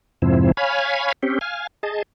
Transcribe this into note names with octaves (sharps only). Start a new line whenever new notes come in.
F2 G#2 C3 F3 C4 E4
C#5 F5 G#5 B5
C4 C#4 G4
F5 G#5
G#4 D#5 A5